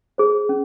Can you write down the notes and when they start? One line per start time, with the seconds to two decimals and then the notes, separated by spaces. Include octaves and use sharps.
0.18 G#4 C5
0.49 C#4